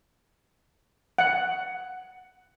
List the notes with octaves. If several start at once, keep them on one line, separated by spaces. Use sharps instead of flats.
F#5